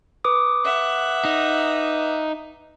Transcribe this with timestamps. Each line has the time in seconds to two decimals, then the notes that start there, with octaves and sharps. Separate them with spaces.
0.24 B4 D6 D#6
0.64 E5 F#5
1.25 D#4